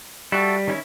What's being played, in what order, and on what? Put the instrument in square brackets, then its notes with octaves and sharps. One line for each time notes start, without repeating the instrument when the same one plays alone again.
[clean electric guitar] G3 [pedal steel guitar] E4 F#4 A4
[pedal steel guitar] D#3 C#4 E4